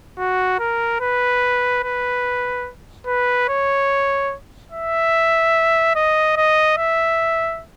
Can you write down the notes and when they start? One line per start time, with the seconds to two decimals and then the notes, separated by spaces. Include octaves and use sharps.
0.19 F#4
0.59 A#4
1.01 B4
1.83 B4
3.07 B4
3.49 C#5
4.72 E5
5.95 D#5
6.37 D#5
6.77 E5